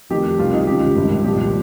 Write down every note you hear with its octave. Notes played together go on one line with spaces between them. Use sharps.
F1 F2 D#3 G4
C2 C3 D#3 F4
D#4
C#2 C#3 F3 G4
G#1 G2 D#3
C2 A#2 F3 G4